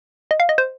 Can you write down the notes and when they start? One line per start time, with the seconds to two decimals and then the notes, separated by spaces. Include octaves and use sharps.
0.31 D#5
0.40 F5
0.49 D#5
0.58 C5